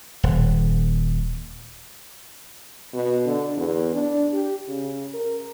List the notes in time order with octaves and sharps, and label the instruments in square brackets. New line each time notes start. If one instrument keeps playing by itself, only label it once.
[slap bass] D#1
[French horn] B2
D3
E2
D4
G4
C#3
A#4